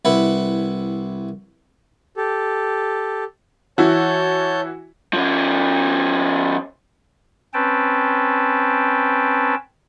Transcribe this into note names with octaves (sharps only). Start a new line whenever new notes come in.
C2 E4 B4 F#5
G4 A4
E3 E4 F#4 C#5 A5 G6
F3 C#4
C4 C#4 B4 G5 A5